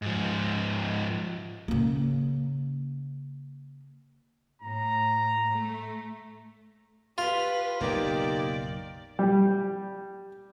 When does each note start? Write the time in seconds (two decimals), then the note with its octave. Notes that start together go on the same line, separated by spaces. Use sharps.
0.02 G#2 F3
1.68 C#3 A#3
4.62 A2 A#5
5.52 A3
7.18 F4 G4 B4
7.81 F#1 B1 A#3 D#4 G4 D5
9.19 G3